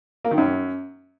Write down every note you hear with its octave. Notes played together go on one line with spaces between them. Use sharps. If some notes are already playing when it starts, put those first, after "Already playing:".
A#3
D#3
F#2